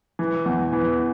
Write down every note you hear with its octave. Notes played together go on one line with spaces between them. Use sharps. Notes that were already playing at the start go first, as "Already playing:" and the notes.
E3
E2
E3